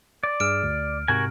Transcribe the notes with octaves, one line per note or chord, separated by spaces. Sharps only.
D5
G2 G#4 E6 F6 D7
D2
G#2 C3 F#4 A#4 G#5 A#5